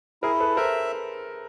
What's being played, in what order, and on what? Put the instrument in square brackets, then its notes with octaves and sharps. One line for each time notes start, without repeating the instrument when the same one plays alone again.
[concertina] E4 [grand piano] G#4 A#4
[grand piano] A4 B4
[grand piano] A#4 C5 [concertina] E5